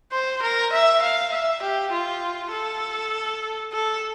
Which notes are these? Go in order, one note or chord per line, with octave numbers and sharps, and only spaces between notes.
C5
A#4
E5
F5
E5
G4
F4
A4
A4